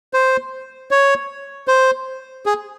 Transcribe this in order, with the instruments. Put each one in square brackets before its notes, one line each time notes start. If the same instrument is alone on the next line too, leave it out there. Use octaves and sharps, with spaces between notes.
[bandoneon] C5
C#5
C5
G#4